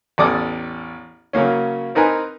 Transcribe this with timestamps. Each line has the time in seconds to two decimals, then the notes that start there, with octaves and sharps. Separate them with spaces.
0.18 A1 E2 A4 D5 D6 D#6
1.33 C#3 F#3 A#3 C#4
1.95 C4 D#4 A#4 B4 G#5